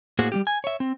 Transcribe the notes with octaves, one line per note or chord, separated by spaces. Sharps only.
A2 A#3 F#4 G#4 C5
G3 A#3 G4
G#5
C#5 E5
C4